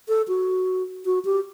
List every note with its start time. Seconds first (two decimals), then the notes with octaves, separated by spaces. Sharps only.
0.08 A4
0.28 F#4
1.05 F#4
1.25 G4